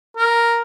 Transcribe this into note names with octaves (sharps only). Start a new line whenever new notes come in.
A#4